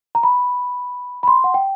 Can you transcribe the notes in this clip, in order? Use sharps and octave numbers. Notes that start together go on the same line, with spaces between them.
A#5
B5
B5
C6
F#5
G5